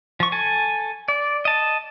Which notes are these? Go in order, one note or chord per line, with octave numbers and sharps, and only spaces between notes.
F3 C#6
A4 G#5
D5
D#5 A5